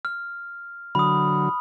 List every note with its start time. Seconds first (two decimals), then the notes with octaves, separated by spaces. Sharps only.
0.05 F6
0.95 D3 F#3 B5 D#6